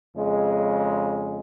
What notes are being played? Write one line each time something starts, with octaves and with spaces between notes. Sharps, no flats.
F2 C#3 G#3